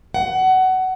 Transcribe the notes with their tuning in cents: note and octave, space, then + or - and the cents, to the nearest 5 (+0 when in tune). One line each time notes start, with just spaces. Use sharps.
F#5 +20